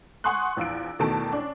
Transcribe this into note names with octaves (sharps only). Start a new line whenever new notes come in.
F#5 G#5 C6 C#6 D#6 F#6
A#1 E2 F4 E6 D7
E2 B2 D#3 A3 A5 D7
C#4 D4